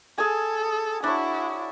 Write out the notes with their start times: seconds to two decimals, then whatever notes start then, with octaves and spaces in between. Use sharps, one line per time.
0.18 G#4 A4 G#5
1.04 D4 E4 F#4 C#5